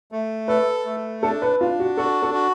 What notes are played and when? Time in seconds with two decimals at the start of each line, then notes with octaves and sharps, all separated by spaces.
0.12 A3
0.48 A4 B4
0.85 A3
1.22 D4 A4
1.42 B4
1.60 D4 F4
1.79 F#4
1.97 F#4 A4
2.22 A4
2.34 F#4